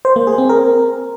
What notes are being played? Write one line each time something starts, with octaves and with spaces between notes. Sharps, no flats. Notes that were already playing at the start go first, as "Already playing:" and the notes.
C5
A#3
G#4
C4
A#4